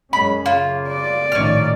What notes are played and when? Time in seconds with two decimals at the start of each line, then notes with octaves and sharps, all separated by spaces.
0.13 F#2 G#3 C#4 B5
0.46 C#3 A#3 F4
0.88 D5
1.32 A#1 A2 D#3 C#4 F6